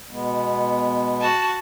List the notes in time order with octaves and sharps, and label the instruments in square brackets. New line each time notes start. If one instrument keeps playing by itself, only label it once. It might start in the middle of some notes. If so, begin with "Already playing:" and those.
[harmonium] B2 G#3 B3
[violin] F#4 A5